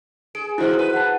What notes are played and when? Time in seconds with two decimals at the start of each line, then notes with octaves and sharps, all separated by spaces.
0.35 G#4 D7
0.58 G#2 E3 E4 F#4 C5
0.79 B4
0.94 F#5 A5